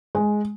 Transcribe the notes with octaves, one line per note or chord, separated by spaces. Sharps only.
G#3